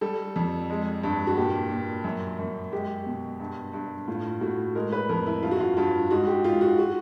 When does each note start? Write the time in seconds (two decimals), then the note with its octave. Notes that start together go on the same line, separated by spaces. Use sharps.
0.01 G3 A4
0.36 F2
0.70 G#3
1.03 G2
1.27 F#4
1.37 A#2 G4
1.71 A#2
2.04 F#2
2.39 F#2
2.72 G#3 G4
3.06 B2
3.40 G2
3.73 G2
4.08 A2 F4
4.41 A2 F#4
4.75 G#3 A#4
4.92 B4
5.09 F2 A#4
5.26 E4
5.43 G2 F4
5.51 F#4
5.60 F4
5.77 G2 F4
6.11 G#2 F#4
6.27 G4
6.44 G#2 F4
6.61 F#4
6.79 F#4